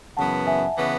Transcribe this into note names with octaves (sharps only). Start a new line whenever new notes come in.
F#2 C#3 E3 B3 F#5 A5
E5 G#5
C#3 E3 B3